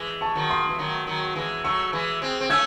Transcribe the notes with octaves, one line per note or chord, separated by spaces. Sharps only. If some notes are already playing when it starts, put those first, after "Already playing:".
Already playing: E3 G#3
A5 C#6
D#3 F#3
C6 D#6
E3
D#3 F#3
D#3 F#3
E3 G#3
F#3 A3 C#6 E6
E3 G#3
G#3 C4
C4
A3 C#4 E6 G#6